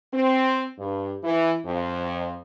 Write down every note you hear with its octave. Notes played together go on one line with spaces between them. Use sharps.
C4
G2
E3
F2